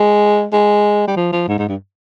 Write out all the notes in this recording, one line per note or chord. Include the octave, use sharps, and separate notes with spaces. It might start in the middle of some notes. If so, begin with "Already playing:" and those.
Already playing: G#3
G#3
G3
F3
F3
G#2
G#2
G2